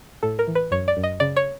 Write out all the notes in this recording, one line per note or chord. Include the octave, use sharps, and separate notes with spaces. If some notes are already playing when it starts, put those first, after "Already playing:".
A2 A4
A#4
E3
B4
F#2 C#5
D5
F#2
D#5
C#3 D5
C#5